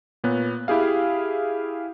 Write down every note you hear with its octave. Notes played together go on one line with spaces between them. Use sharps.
A#2 B3 C#5 F#6
E4 G4 G#4 F5